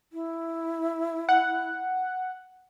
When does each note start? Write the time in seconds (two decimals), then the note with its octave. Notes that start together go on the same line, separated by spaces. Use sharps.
0.13 E4
1.29 F#5